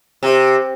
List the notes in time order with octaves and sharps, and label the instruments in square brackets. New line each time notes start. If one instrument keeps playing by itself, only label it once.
[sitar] C3